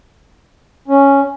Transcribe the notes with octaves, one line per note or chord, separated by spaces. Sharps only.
C#4